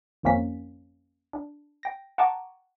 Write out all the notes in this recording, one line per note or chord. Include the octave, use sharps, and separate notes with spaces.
G#1 F2 F3 A#3 C#4 B6
D4
G5 A#6
F#5 G5 A5 A#5 C#6 D6